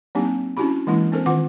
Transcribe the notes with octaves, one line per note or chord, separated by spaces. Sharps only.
F#3 A#3 C4 D4 D#4 G4
C#4 D4 E4 F#4 G4 B5
E3 G#3 A#3 D4 E4
C4 D4 A4 A#4 C5
D#3 F4 F#5 D6